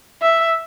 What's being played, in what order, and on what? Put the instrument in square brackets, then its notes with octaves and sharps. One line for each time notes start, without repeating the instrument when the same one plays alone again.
[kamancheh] E5